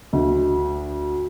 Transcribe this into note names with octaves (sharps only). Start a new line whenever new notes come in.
D2